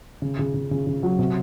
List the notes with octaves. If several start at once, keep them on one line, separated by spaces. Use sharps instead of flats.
C#3
C#3
C#3
C#3
C#3
F#3
C3